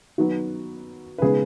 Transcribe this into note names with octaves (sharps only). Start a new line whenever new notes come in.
D#3 F#3 B3 D#4 F#4
B4
C#3 G#3 B3 D#4 G#4